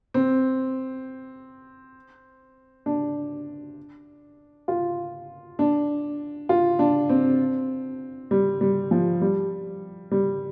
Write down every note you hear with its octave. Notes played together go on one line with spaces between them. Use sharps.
C4
D4
F4
D4
F4
D4
C4
G3
G3
F3
G3
G3